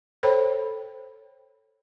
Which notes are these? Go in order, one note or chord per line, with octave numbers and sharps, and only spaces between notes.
A4 C5 C#5 G5 B5